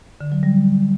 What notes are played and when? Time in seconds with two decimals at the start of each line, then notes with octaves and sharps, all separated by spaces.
0.21 D3
0.32 F#3
0.43 G3